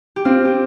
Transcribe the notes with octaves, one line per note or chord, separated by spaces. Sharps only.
G4
C4 F4
G4